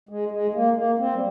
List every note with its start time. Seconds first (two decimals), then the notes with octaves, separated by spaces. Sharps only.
0.09 G#3
0.31 G#3
0.54 A#3
0.76 A#3
0.98 C4
1.13 G3